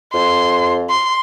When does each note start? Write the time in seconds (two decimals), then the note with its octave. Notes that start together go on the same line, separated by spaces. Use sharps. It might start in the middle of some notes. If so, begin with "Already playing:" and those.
0.14 F2 C6
0.90 C6